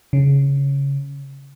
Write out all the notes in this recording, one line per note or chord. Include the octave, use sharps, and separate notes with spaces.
C#3